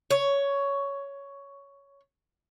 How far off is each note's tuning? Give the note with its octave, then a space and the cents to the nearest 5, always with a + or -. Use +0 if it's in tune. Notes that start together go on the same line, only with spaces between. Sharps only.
C#5 +10